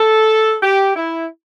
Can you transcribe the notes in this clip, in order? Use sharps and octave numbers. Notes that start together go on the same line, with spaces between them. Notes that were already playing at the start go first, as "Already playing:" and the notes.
Already playing: A4
G4
E4